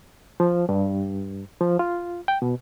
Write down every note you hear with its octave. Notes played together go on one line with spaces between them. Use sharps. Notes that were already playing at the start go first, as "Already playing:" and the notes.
F3
G2
F3
F4
G5
B2